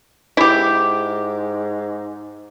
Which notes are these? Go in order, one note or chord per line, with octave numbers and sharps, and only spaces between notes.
G#2 E4 G4